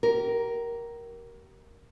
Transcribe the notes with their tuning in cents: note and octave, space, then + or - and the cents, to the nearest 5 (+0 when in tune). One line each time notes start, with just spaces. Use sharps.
G4 -35 A#4 +5